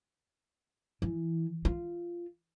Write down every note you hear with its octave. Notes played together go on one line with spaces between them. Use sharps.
E3
F4